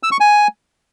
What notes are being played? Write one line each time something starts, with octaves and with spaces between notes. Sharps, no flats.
E6
C#6
G#5